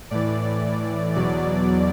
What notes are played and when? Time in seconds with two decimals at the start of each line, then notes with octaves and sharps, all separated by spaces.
0.11 A2 E3 D5
1.15 E2 B2 F#3 D5